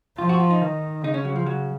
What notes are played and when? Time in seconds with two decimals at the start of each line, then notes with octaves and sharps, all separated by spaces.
0.18 F3 F4
0.29 F#4
0.40 F4
0.50 D#4
0.62 D#3
1.04 C#3 D#4
1.14 C#4
1.25 F#3
1.36 F3
1.46 F#3